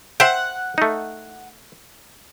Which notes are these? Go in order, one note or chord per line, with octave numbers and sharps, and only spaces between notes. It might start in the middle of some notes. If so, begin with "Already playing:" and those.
C5 E5 F#5 G5
A3 D#4